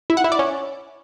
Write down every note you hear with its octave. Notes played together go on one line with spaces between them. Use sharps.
E4
F#5
E4
D5
C#4